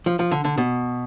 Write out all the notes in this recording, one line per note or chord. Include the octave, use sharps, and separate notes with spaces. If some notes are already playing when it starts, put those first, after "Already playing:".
F3
F3
D3
D3
B2